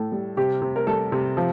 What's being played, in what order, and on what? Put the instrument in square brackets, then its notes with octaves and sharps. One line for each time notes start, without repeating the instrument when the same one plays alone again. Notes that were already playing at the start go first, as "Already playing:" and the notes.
Already playing: [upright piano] A2 A4
G3
C3 G4
C3
A#4
G3 A4
C3
F3